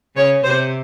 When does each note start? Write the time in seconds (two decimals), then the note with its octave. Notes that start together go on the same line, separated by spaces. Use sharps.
0.16 C#3 C#5
0.43 C3 C5